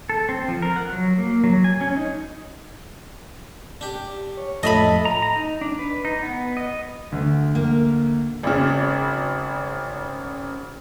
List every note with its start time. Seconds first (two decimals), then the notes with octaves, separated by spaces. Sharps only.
0.09 A4
0.29 C4
0.48 F3
0.62 A#4
0.76 F#5
0.93 F#3
1.18 A#3
1.44 F#3
1.64 G#5
1.81 C#4
1.97 D#4
3.81 D4 G4
4.37 C#5
4.63 F2 A2 D#5 E5 A5 B5
5.05 A#5
5.22 A#5
5.36 D#4
5.61 D4
5.79 B4
6.05 D#4
6.23 B3
6.57 D#5
7.12 D2
7.55 A#3
8.43 G#1 C#3